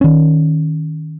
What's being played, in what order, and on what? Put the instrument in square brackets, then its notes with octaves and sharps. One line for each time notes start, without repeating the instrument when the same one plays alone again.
[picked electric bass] D#3 C#4